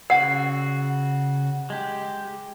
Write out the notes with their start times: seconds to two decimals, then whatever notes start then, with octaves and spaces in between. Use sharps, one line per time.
0.10 C#3 F#4 F#5 E6
1.70 G#3 G4